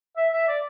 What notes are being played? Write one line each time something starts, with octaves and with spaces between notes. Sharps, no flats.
E5
E5
D5